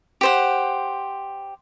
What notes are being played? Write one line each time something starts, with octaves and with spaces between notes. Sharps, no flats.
G4 C5 F#5